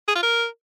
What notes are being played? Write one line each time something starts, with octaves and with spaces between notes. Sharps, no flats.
G#4
F4
A#4